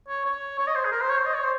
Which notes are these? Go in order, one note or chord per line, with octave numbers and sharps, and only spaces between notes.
C#5
C#5
C#5
D#5
C5
G#4
A#4
C5
C#5
C5
D#5
C#5
C5